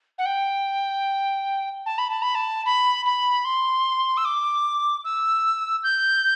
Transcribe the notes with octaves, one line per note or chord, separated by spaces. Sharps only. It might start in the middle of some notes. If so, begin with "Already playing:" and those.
F#5
G5
A5
B5
A5
B5
A5
B5
B5
C6
E6
D6
E6
G6